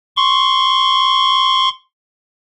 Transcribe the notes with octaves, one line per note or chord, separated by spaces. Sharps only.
C6 C#6